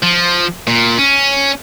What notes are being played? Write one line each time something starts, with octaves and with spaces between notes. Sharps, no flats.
F3
A#2
C#4